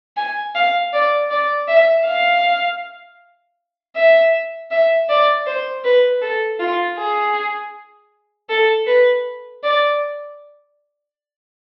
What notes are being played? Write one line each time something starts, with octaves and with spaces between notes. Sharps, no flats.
G#5
F5
D5
D5
E5
F5
E5
E5
D5
C5
B4
A4
F4
G#4
A4
B4
D5